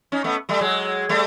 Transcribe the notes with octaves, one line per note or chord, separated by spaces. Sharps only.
C#4 D#4
A3 B3
G3 A3
F#3 G#3
G3 A3